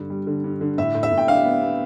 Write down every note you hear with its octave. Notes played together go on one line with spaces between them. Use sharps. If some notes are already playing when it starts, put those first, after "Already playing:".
Already playing: G2 D3
G3
D3
G2
D3
A2 E5
A2
E5
A2
G5
D4 F5
B3
B3